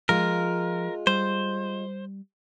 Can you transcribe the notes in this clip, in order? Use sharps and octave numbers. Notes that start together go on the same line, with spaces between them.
F3 G#3 F4 A#4
G3 C5